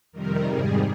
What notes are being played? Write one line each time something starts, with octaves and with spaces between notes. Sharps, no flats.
F2 C3 D#3 G3 A#4
G#2 G3 G#4